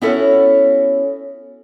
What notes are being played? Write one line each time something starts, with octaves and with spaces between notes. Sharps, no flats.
B3 C#4 E4 F#4 A4 C#5